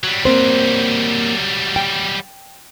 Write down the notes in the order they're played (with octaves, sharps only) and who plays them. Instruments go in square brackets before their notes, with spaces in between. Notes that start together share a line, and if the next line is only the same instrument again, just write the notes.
[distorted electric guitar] F#3 G3
[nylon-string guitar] A#3 C4 C5
G5